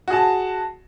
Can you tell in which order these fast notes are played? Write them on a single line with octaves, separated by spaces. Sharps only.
F#4 G#4 A5